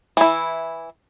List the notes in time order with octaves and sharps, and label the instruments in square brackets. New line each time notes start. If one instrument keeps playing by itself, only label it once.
[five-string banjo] E3 E4